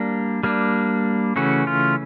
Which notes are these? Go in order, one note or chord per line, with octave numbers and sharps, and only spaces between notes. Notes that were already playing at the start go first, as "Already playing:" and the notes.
Already playing: G3 A#3 D4
G3 A#3 D4
C#3 E3 A3 C#4 F#4
F4